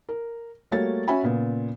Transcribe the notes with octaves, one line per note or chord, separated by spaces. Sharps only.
A#4
G3 A3 A#3 F#4 C#5 A6
C#4 F#4 E5 G#5 B5
A#2 C#3 B3